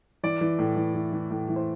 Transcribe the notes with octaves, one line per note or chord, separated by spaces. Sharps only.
E3 D5
E3
A2
E3
E3
E3
A2
E3
C5